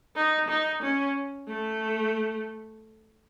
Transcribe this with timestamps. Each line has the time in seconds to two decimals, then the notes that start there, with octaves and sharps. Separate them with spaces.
0.16 D#4
0.49 D#4
0.83 C#4
1.48 A3